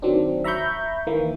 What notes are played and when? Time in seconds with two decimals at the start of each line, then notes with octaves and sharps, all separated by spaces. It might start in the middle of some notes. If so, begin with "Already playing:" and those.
0.02 D#3 F#3 C4 D4
0.44 E5 A#5 B5 C#6 G6
1.07 D#3 E3 A#3